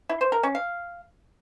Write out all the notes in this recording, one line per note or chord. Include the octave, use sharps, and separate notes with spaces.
E4
C5
A#4
C#4
F5